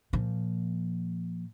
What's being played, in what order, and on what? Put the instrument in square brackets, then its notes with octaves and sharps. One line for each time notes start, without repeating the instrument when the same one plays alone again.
[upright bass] A#2 F3